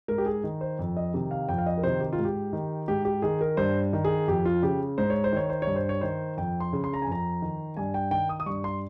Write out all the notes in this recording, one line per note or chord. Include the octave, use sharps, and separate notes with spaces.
G#2 A#4
G4
G#4
D#3
C5
F2
D#5
C3 D#3
F5
F2 G5
F5
D#5
A#4
C3 D#3 C5
G4
F4
G#2
G4
D#3
G#2 G4
G4
D#3 G#4
A#4
G2 C5
D#3
G#4
F2 G4
F4
C#3 G4
G#2 C5
C#5
C5
D#3 C#5
C5
C#5
G2
C5
C#5
D#3 C5
F2 G5
C6
C#3
C6
A#5
G#5
F2 A#5
D#3
G2 G#5
G5
D#3 G5
D#6
D#6
G2 C#6
C6